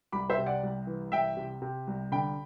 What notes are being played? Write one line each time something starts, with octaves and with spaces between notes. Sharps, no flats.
C2 B5 D6
C5 E5
C3
D5 F#5
C2
E3
C2 E5 G5
C3
C3
C2
D3 G5 B5